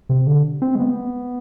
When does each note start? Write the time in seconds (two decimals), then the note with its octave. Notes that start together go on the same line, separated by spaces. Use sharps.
0.09 C3
0.27 D3
0.62 C4
0.75 G#3
0.79 B3